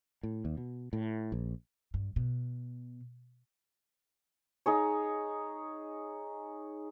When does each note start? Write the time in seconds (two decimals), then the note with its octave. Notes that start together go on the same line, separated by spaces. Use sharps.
0.23 A2
0.45 D#2
0.57 B2
0.93 A2
1.32 A#1
1.94 G2
2.16 B2
4.66 D#4 G#4 C#5